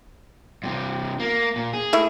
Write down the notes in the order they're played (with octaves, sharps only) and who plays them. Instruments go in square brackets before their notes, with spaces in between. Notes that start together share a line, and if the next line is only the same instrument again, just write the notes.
[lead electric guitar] G2 C3
A#3
A#2
G#4
[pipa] A3 E4 E5